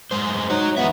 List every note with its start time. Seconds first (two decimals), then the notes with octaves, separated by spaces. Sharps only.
0.11 F#2 G#3 C5
0.50 D#4 F#4 C#5
0.77 E2 D3 B3 E5